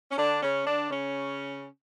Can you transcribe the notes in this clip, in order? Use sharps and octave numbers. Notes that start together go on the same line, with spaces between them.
C#4
D3 D4
C#3 C#4
D3 D4
C#3 C#4